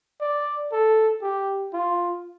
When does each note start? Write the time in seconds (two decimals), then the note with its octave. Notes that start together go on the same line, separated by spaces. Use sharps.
0.21 D5
0.72 A4
1.22 G4
1.74 F4